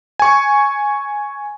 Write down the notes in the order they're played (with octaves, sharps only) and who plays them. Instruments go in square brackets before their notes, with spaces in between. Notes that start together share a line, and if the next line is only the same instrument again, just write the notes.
[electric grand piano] G#5 C#6